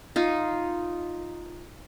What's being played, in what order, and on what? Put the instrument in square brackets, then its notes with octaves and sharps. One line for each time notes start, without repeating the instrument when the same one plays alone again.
[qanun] D#4 F4